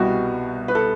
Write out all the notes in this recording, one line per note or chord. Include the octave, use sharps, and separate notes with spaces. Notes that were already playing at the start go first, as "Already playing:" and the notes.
Already playing: C2 B2 G3 F#4
B4
A4